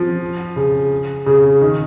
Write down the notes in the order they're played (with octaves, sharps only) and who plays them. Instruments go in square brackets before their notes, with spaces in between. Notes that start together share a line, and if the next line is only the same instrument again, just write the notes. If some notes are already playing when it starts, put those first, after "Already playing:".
Already playing: [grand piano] F3
C#3
C#3
D#3